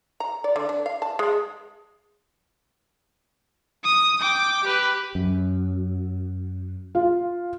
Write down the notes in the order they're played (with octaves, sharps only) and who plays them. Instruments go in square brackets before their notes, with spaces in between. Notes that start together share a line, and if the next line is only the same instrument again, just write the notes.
[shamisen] A#5
D5
D3
D4
F5
A5
G#3
[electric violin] D#6
G5 D6
G4 B4
[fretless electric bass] F#2
[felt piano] F4